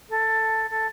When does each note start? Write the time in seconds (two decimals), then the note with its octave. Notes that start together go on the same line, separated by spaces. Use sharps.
0.10 A4
0.70 A4